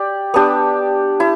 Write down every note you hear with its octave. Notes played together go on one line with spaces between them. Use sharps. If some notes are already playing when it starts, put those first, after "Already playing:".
Already playing: G4 D5
B3 D4 G4
E4